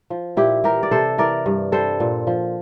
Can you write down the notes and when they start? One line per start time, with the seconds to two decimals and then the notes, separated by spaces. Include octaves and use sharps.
0.10 F3
0.37 A#2 E4 G4
0.64 E3 G4 A#4
0.83 D5
0.91 C3 A4 C5
1.18 E3 A#4 D5
1.46 G2
1.72 G3 A4 C5
2.00 A#2
2.27 F3